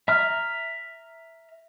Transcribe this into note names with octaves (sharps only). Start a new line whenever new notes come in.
E5 A#5 F6